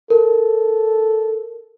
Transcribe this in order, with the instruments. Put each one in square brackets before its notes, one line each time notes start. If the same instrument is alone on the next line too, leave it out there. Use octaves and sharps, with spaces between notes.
[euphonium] A4 [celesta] A#4